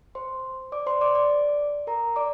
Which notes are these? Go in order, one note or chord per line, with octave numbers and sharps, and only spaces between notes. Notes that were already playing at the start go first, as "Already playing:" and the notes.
C5 C6
D5 D6
C5 C6
D5 D6
D5 D6
A#4 A#5
D5 D6